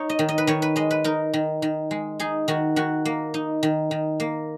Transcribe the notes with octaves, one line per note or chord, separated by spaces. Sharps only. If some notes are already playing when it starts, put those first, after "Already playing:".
Already playing: D#4 C#5
D#5
D#3
D#5
B4
D#3 C#5
B4
G#3 D#5
B4
D#4 A#4
D#3
D#3
G#3
D#4 G#4
D#3 F#4
D#3 F#4
A#3
D#4
D#3
D#3
A#3